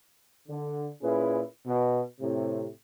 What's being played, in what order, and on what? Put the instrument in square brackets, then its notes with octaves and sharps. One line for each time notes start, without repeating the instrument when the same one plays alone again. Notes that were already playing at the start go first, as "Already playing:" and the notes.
[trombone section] D3
A#2 C#4 E4 G#4 B4
B2
A2 C3